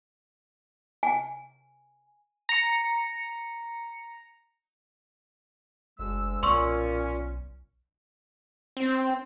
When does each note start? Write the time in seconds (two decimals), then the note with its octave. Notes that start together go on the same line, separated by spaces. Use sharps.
1.03 G#5
2.49 A#5 C#7
5.99 F#1 D2 G#3 E6
6.43 B1 A#2 C#4 C6 C#6 E6
8.77 C4